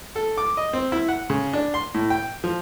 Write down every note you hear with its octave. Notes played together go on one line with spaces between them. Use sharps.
A4
D6
D#5
C4
E4
F#5
C#3
D4
C6
A2
G5
F3